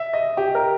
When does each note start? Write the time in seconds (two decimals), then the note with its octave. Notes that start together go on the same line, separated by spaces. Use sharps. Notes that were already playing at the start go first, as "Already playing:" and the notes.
Already playing: E5
0.13 D#5
0.37 G4
0.55 A#4